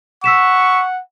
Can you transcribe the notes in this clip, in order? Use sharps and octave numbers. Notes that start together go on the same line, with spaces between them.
F#5 C#6 E6 B6 E7